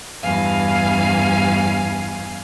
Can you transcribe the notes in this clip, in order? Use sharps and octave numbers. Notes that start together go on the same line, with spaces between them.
E2 G2 F5 G#5